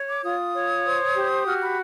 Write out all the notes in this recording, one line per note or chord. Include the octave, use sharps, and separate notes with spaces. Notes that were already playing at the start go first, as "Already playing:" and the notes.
Already playing: C#5
D6
F4 D#6
C#5
C5
G4
F#4 F6
B5